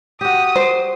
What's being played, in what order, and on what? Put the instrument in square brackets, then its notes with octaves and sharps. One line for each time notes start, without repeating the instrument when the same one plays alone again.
[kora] F#4 G4 [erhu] D#6
[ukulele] C5